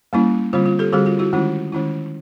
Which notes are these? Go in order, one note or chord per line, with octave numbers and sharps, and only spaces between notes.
G3 A#3 C#4 E4
D3 G3 C4 F4
F4
G4 A4
D3 G3 C4 F#4 G#4
F4
E4 F#4
D#3 G#3 C#4 E4 F4
D#3 G#3 C#4 E4